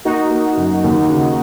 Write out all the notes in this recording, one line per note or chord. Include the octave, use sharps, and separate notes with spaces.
A#3 D#4 F#4
A#3
F#2
D#2
C#3